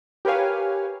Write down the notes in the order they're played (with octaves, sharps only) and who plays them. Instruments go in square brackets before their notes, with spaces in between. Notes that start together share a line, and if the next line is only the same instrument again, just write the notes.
[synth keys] G4 A#4 B4 C#5 F5 G#5